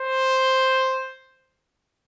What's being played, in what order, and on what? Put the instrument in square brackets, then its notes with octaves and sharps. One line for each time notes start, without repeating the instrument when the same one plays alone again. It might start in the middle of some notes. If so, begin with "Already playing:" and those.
Already playing: [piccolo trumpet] C5